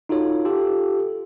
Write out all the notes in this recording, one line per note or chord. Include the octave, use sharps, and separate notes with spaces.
D#4 F4 F#4 A4 C#5
F4 G4 A4